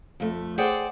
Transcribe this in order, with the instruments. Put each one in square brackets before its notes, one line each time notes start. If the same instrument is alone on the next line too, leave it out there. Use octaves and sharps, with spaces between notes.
[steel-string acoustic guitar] F2 A3
G#4 C5 D5 F#5 G5